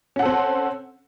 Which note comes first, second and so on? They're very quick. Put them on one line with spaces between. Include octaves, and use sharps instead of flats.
C#4 F#5 A4 C4